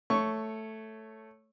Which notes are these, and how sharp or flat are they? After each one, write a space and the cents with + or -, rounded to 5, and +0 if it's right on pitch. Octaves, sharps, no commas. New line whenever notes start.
A3 +0 C#5 +0 C#6 +0